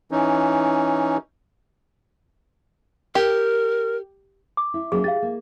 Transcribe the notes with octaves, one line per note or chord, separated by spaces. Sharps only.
E3 C#4 D#4
G4 A#4
D6
E4
F#3 A#3 C#4 G#4
G4 F5 A6
A#3